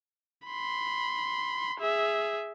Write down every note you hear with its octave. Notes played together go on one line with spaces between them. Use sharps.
B5 C6
G#4 E5